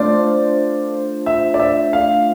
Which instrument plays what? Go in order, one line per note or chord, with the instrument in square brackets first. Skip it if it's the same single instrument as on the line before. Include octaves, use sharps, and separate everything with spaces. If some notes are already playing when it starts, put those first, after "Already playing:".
Already playing: [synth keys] A3 D4 F4 C5 [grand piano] D5
[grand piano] E5
D5
E5
F5